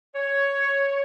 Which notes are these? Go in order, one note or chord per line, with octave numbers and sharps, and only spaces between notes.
C#5